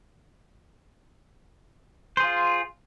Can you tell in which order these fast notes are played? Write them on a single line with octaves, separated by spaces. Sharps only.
C5 G#4 F4